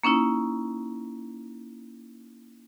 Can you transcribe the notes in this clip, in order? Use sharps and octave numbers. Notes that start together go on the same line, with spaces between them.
A#3 C#4 D#4 E4